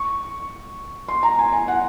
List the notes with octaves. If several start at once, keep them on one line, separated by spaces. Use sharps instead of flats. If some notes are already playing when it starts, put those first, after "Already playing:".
Already playing: C#6
C6
A#5
G#5
G#5
F#5